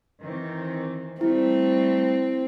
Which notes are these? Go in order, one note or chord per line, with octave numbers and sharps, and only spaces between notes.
D#3 E3 C4
G3 A3 C4 E4